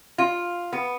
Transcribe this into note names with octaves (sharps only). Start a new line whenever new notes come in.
F4
B3